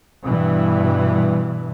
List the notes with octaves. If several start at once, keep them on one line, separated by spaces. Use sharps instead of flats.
G2 B2 E3